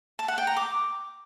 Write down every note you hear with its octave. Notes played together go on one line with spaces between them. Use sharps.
A5
F#5
G5
A#5
D6